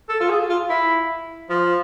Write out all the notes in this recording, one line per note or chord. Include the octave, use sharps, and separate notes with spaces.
A4
F4
G#4
F4
E4
F3